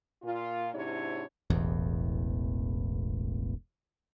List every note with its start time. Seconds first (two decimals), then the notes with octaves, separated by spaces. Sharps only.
0.23 A#2 F4
0.74 G#2 C3 D4 E4 C#5
1.50 E1 A1 E2